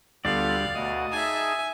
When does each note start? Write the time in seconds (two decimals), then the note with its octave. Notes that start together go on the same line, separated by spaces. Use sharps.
0.25 D2 G3 B3 F4 A4 D5 F5
0.75 D2 B2 F#4 D#5
1.12 D#4 G#4 E5 G#5 A5